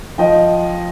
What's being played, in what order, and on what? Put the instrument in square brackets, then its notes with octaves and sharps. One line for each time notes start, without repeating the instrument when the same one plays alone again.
[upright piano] F3 D#5 G5